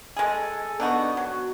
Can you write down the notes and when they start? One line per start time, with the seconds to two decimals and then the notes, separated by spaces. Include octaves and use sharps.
0.17 G#3 G#4 A4
0.80 B3 D4 D#4 F#4
1.17 F#3 F#4